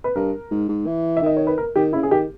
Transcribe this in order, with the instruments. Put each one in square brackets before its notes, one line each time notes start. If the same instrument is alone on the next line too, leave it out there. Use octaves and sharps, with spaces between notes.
[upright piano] B4
[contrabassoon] G2 [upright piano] A#4
[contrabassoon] G#2
G#2
E3
[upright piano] E5
[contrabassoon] D#3 [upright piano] D#5
[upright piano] C#5
B4
A#4
[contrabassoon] D#3 [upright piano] G4
[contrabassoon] C#3 [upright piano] E4
[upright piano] G#4
[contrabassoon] D#3 [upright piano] G4